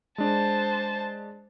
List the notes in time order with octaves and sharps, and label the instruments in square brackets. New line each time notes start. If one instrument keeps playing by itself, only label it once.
[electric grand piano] G#3 D4 [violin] C5 A5